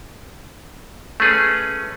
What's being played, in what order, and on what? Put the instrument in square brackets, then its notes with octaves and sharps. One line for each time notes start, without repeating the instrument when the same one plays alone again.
[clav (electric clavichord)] A3 C#4 G#4 B4